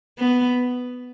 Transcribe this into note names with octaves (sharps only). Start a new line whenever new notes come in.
B3